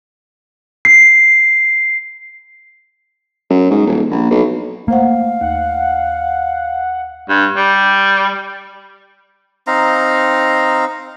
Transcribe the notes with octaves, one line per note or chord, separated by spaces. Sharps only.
C7
F#2
G#2
D#1
A#1
B1
A3 A#3 C5 F5 F#5
D#2 F#5
G2
G3
C4 D#4 F5 A#5